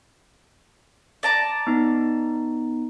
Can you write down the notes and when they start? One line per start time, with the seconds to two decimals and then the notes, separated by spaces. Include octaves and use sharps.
1.23 D5 A5 A#5
1.67 B3 D#4